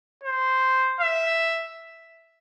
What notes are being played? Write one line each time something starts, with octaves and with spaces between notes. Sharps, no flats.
C5
E5